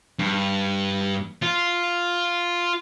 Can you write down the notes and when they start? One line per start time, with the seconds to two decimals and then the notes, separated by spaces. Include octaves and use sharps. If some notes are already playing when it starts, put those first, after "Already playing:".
0.19 G2
1.42 F4